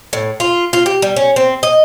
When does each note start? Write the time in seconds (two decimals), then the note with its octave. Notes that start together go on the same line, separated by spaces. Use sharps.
0.13 A2
0.40 F4
0.73 F4
0.86 G4
1.02 G3
1.16 C#4
1.36 C4
1.63 D#5